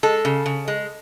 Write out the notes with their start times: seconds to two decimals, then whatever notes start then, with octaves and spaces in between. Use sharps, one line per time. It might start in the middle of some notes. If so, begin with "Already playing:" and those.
0.03 G#3 A4
0.25 C#3
0.46 C#3
0.68 G#3